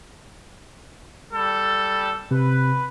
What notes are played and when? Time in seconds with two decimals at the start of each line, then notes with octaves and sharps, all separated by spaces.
1.31 G3 A4
2.31 C3 B4